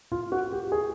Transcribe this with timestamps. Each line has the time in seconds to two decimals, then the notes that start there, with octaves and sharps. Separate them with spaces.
0.12 F4
0.32 F#4
0.52 G4
0.72 G#4